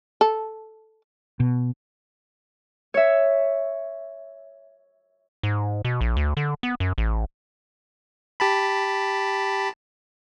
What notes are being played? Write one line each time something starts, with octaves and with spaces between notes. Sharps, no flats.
A4
B2
C#5 E5
G#2
B2
A#1
D2
D3
B3
F#2
A1
G4 A5 B5